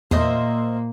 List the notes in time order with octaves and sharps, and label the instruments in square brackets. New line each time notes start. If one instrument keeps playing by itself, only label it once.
[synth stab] E2 [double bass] A#2 A#3 [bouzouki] C5 D#5 E5